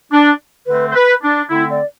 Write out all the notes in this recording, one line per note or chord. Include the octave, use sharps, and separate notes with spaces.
D4
D3 A3 C4 B4
C5
B4
D4
D3 A3 C4 E4
D5